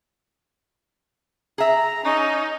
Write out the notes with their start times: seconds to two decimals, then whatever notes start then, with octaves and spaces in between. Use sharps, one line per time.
1.58 G#4 E5 A#5
2.04 C#4 D#4